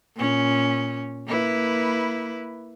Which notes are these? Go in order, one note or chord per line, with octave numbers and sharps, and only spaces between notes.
A#2 C#4
A#3 E4 B4